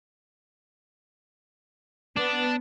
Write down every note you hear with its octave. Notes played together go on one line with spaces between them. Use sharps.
B3 D4